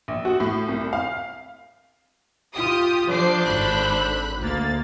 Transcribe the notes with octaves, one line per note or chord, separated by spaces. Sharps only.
A#1
F#4
A2
C2
F5
F4 G4 D#6
D3 F3 D4 C5 D6 C7
G#1 B5 F#6
D2 A#3 A6